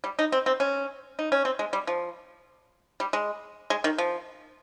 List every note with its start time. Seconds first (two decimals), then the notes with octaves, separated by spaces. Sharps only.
0.04 G3
0.19 D#4
0.32 C4
0.46 C4
0.60 C#4
1.19 D#4
1.32 C#4
1.45 C4
1.59 G#3
1.73 G3
1.87 F3
3.00 G3
3.13 G#3
3.70 G#3
3.84 D#3
3.98 F3